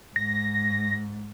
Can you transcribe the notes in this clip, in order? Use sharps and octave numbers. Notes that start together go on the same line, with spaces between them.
G#2 A#6